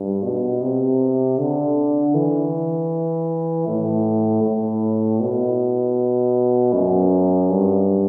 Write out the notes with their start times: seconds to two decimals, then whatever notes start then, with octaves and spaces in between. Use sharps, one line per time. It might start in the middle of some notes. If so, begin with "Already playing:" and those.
Already playing: G2
0.24 B2
0.62 C3
1.38 D3
2.14 E3
3.68 A2
4.44 A2
5.20 B2
6.73 F#2
7.50 G2